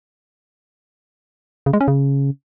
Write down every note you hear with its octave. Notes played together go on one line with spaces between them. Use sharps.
C#3
G#3
C#4
C#3